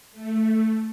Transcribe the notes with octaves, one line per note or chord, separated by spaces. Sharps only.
A3